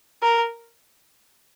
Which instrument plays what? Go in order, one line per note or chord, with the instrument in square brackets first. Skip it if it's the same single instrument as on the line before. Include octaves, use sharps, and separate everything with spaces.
[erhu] A#4